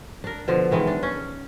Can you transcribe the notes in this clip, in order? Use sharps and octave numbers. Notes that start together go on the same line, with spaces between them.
D4 A#4
B2 D3 F3
D#3 E3 G#3
D4
C#4